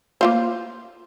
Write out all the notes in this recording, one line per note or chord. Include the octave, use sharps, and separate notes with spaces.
A#3 F4 C5